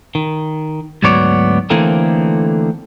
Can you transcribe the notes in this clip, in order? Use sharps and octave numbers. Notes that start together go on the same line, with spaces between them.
D#3
D2 G#2 F#3 B3 C#5 D5
D3 E3 A3 A#3 C4 D#4